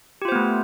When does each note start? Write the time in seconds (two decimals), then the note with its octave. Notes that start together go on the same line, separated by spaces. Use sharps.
0.22 G4
0.25 F4
0.28 C5
0.32 B3
0.35 A3